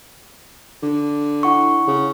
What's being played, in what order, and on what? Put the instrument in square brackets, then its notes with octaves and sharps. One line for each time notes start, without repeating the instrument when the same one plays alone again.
[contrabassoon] D3
[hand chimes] E4 F#5 C#6
[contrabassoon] C#3